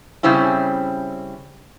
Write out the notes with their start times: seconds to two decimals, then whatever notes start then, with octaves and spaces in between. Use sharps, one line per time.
0.23 C#3 G3 C4 C#4 E4